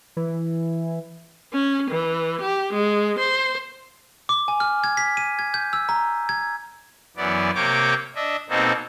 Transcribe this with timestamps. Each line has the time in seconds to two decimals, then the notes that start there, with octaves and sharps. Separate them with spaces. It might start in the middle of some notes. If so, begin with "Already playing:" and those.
0.17 E3
1.53 C#4
1.91 E3
2.41 G4
2.74 G#3
3.19 C5
4.29 D6
4.48 G#5
4.60 F6
4.84 G#6
4.97 B6
5.17 D#7
5.39 G#6
5.54 G6
5.73 E6
5.89 A#5
6.29 G#6
7.17 F#2 E3 B3 D5
7.55 C3 A#3 C#5 G5 D6
8.15 D4 D#5 E5
8.49 B2 A#3 C4 D#4 A4